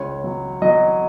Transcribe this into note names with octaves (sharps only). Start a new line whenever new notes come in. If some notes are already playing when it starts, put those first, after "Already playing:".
Already playing: C#2 C#5
F#3
F#3 D#5